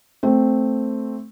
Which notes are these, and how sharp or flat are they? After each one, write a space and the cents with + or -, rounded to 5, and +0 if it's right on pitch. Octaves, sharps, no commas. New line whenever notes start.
A3 +0 C4 +0